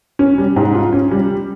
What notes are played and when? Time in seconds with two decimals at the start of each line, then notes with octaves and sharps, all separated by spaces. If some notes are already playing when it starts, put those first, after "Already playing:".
0.19 C#4
0.38 G3
0.56 G#2
0.75 F4
0.93 C#4
1.11 G3